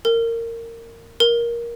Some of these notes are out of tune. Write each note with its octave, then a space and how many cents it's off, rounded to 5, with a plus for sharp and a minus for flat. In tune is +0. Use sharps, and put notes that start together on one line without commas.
A#4 -20
A#4 +15